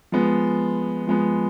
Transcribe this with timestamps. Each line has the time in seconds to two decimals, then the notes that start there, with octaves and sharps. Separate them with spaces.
0.12 F3 G#3 B3
1.07 F3 G#3 B3